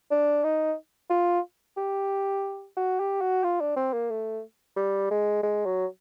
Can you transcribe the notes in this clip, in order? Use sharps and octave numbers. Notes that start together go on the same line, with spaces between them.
D4
D#4
F4
G4
F#4
G4
F#4
F4
D4
C4
A#3
A3
G3
G#3
G#3
F#3